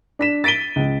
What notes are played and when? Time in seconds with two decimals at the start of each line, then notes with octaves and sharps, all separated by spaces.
0.19 D4 B6 E7
0.44 A6 B6 D7 D#7 G7
0.76 C#2